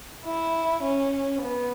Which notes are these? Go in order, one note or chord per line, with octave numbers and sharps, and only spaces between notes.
E4
C#4
B3